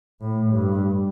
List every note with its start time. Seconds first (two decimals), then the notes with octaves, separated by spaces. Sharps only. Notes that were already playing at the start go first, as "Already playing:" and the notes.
0.21 A2
0.53 G2